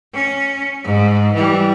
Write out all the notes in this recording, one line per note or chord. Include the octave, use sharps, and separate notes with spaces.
C#4
G#2
E3 G3